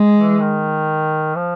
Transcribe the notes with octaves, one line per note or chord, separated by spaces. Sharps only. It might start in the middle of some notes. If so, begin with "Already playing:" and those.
Already playing: G#3
E3
D#3
F3